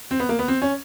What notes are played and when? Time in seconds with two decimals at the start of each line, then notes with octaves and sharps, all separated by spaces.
0.11 C4
0.20 B3
0.29 A#3
0.39 B3
0.48 C4
0.62 C#4